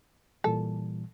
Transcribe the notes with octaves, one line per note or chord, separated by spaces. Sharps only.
A#2 E3 G3 A4